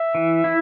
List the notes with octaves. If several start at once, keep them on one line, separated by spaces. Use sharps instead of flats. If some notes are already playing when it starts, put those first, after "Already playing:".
Already playing: E5
E3
E4